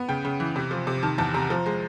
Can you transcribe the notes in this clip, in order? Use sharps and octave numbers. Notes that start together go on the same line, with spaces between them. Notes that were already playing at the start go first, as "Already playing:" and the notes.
Already playing: B3
C#3 G5
C#3
E3
C3
F3
C3
D#3 A5
E2 A5
C3 A#5
F3
G#3